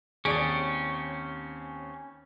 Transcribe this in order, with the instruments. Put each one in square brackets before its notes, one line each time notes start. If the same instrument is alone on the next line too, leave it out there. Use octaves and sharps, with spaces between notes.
[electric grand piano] D#2 D7 [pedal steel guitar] C4 C#4 [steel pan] G#4 D5